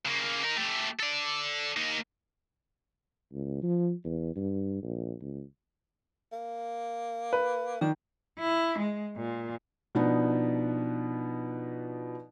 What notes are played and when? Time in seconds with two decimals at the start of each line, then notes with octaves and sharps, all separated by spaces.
0.05 C#3 A#3
0.43 D#4 A#4
0.57 A3 G4
1.00 A4 D5
1.77 A#3 D#4
3.32 C#2
3.62 F3
4.04 E2
4.35 G2
4.83 A#1
5.21 C#2
6.32 A#3
7.33 B4
7.81 D#3 D4
8.39 E4
8.79 G#3
9.17 A#2
9.95 B2 F3 B3 D4 D#4